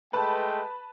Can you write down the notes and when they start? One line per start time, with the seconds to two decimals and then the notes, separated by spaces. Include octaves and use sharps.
0.13 G#3 A3 B4 G5 A5 B5